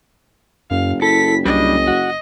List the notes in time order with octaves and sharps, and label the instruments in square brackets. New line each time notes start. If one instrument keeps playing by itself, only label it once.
[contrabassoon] F#1 [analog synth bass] F#2 [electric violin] F5
[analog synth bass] E4 [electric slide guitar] A4 [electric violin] B6
[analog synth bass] C2 [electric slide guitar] G3 D4 [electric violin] D#5
[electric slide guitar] F#4